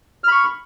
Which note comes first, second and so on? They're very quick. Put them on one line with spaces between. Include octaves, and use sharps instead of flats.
F6 B5 C#6